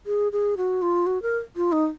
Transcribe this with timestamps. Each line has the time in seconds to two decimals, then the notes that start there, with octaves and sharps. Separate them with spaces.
0.06 G#4
0.32 G#4
0.57 F#4
0.82 F4
1.06 F#4
1.22 A#4
1.56 F4
1.72 D#4